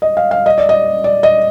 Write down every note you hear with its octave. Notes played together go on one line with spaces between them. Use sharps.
D#5
F5
F5
D#5
D5
D#5
D5
D#5